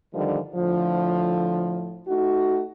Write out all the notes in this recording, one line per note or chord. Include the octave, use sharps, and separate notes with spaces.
G2 D3 D#3 F3 G3
A2 D3 F3
A3 D#4 F#4